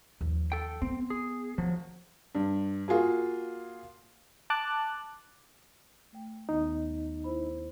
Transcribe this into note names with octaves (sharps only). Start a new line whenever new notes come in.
D#2 F3
A4 G5
B3 C4
G#4
D#3 F3 F#3 C4
G2
A#3 F4 F#4 G#4
A5 D6 F#6
A3 G5
D#2 D#3 B3 D#4
E4 C5 B5